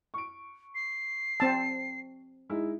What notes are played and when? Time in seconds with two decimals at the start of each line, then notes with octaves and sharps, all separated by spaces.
0.14 C#6 D7
0.75 C7
1.40 C4 A5
2.49 G#3 D#4 E4